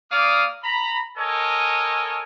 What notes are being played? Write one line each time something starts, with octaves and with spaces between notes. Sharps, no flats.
A#3 D5 F5 D#6
A#5 B5
A4 A#4 C#5 D#5 G#5